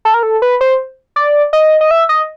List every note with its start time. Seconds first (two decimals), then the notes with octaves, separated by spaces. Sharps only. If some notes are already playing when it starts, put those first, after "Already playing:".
0.05 A4
0.14 A#4
0.23 A4
0.42 B4
0.61 C5
1.16 D5
1.53 D#5
1.81 D#5
1.91 E5
2.09 D#5